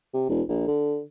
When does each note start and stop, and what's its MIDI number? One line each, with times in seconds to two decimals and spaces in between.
0.14 0.25 48
0.29 0.42 28
0.49 0.67 34
0.68 1.01 50